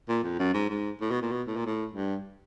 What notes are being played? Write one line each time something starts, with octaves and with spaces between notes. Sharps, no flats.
A#2
F2
F#2
G#2
G#2
A2
B2
A#2
B2
A2
A#2
A2
G2